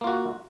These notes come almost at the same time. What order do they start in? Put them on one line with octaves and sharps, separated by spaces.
A#3 F4 F#4